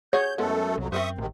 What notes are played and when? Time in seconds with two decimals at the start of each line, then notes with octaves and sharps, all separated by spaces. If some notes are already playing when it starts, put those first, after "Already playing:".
0.13 G#4 C#5 F#5 G6
0.38 F#2 G#3 A3 B3 E4 A4
0.78 C2 F2 F#3
0.92 F#2 C4 A#4 C5 E5 C#6 D#6
1.18 A1 G#2 C3 D#3